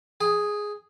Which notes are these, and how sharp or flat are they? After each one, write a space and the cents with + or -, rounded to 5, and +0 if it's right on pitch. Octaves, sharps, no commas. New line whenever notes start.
G#4 +0 G#5 -40